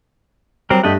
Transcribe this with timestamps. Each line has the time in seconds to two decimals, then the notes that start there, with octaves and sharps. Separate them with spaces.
0.70 F#3 G3 C4 A#4
0.84 G2 A3 G4 D#5 F#5